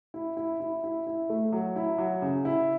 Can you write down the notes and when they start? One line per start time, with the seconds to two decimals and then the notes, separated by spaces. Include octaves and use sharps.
0.14 E4
0.37 E4
0.60 E4
0.84 E4
1.07 E4
1.30 A3
1.52 F#3
1.76 E4
1.98 F#3
2.22 C#3
2.45 E4